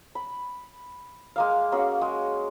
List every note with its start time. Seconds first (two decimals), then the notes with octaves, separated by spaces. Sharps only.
0.15 B5
1.36 G#3 A#3 F5
1.72 A#3 C#4 F#4 G#4
2.01 G#3